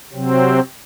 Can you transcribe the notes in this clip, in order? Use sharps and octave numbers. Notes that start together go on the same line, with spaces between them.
C3 F#3 C4